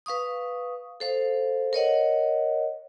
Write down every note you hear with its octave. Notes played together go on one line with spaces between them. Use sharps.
B4 F5 C#6 D#6
A4 C5 F5
A#4 C#5 D#5 F#5